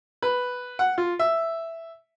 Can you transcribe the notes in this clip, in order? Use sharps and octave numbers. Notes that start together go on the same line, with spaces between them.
B4
F#5
F4
E5